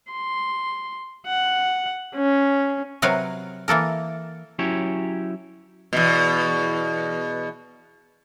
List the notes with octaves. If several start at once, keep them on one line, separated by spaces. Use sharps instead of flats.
C6
F#5
C#4
C3 F#3 A#4 B4 C#5 F5
E3 A#3 A4 A#4
F#3 C#4 E4 G4 C#5
E2 B2